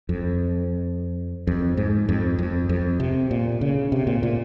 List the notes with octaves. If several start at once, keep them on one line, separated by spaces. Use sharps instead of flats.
F2
F2
G#2
F2
F2
F2
C3
A#2
C#3
C3
A#2
A#2